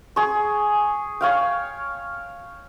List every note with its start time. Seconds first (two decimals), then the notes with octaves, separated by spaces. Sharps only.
0.16 G#4 C#6
1.21 C#5 F5 G5